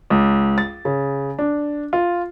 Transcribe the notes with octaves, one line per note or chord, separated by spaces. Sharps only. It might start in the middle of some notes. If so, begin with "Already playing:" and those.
C#2
A6
C#3
D4
F4